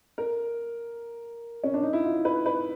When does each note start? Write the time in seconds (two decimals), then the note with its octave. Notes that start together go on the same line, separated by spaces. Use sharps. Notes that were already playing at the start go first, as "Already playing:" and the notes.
0.18 A#4
1.64 C#4
1.74 D4
1.83 D#4
1.93 E4
2.04 F4
2.25 B4
2.46 B4